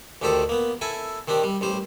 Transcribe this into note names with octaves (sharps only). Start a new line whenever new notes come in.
D2 A2 D#3 G4 A4 C5
A#3 B3
E4 A4 G#5
D#3 C4 D4 G4
G3
A1 G3 C5